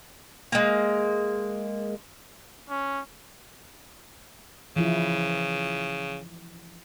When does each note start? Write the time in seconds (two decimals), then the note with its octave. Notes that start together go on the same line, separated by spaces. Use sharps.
0.52 G#3 A#3
2.70 C#4
4.76 C#3 E3 F3 E4